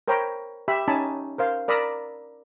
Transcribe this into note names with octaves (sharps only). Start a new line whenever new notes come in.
A#4 C5 C#5 G5 A#5 B5
G4 E5 B5
C#4 D#4 G#5 A5 B5
A#4 C5 F5
A#4 D5 A#5 B5 D#6 E6